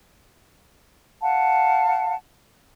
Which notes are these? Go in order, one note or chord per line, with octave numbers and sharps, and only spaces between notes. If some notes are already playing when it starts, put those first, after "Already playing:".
F5 F#5 A5